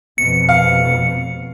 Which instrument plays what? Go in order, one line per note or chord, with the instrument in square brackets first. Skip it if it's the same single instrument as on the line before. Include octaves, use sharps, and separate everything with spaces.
[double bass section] F1 F2 B2 [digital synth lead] C#7
[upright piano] F5